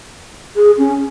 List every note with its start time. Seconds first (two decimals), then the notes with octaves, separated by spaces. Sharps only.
0.56 G#4
0.78 C#4